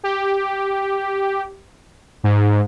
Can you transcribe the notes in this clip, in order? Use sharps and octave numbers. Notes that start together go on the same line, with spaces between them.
G4
G#2